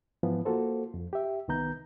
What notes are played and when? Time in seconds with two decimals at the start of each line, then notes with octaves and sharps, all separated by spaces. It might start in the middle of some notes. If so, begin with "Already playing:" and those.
0.23 G#2 E3 F3 B3
0.45 A#3 F4 F#4 A4 C5
0.94 F2
1.13 G4 E5
1.48 C2 D#3 B3 A#5 G6